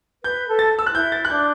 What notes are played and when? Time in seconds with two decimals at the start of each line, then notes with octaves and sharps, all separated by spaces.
0.24 B4 G6
0.48 A4
0.59 A6
0.79 E6
0.86 F#6
0.90 F#4
0.94 E4 G6
1.12 A6
1.25 F#6
1.30 D4 G6